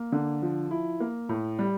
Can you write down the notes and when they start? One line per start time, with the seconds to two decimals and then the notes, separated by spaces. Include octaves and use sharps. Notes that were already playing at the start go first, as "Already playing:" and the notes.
Already playing: A#3
0.12 D3
0.42 F3
0.71 E4
1.00 A#3
1.29 A2
1.59 G3